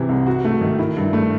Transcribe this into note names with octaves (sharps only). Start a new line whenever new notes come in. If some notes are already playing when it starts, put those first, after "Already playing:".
Already playing: C3 E3
C2
F#4
A3
D#3
E4
G2
A3